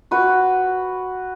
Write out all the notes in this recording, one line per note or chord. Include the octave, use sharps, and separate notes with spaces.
F#4 B4 C#6